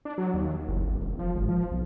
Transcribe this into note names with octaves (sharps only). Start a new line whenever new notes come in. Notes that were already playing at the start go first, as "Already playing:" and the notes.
D4
F#3
D#2
F#1
G#1
E1
F3
G#1
F3
B1